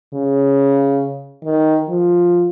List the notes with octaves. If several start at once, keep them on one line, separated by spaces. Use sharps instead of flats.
C#3
D#3
F3